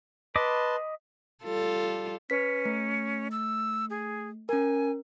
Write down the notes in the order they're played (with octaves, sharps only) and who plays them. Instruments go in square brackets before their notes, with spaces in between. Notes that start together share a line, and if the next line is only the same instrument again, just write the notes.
[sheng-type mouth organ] B4 A5 C6 [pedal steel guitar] D#5 B5 D6
[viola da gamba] G3 F4 A4
[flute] C#4 [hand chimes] B4 B6
[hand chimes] A3
[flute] E6
G#4
[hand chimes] C#4 A#4 [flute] G#5